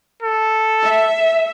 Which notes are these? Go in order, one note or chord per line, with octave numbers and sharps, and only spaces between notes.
A4
E5